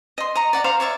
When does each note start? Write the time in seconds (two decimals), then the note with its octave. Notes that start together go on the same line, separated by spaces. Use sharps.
0.18 D#5 C6
0.35 D#5 A#5 C#6
0.53 D5 F#5 A#5
0.64 C5 F5 A#5 C#6
0.80 C#5 D5 E5 C#6